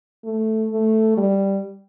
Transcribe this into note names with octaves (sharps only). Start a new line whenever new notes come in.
A3
A3
G3